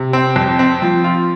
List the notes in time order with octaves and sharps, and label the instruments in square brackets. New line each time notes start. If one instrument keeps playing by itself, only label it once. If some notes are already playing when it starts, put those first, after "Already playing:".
Already playing: [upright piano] C3
C4
F2
C4
F3
F4